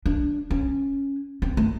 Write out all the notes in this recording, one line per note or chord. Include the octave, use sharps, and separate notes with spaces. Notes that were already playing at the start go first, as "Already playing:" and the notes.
D4
C#4
C4
A3